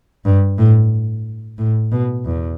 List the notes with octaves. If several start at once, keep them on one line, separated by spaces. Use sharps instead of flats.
G2
A2
A2
B2
E2